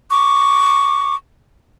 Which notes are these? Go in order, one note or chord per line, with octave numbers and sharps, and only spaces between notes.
C#6 D6